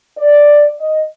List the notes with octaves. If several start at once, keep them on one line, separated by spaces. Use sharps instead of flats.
D5
D#5